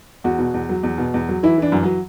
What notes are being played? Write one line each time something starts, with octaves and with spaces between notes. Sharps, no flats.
E2 F#4
B2
E2
F#3
E2
B2
E2
F#3
E3 E4
E3 D4
F#2
F#3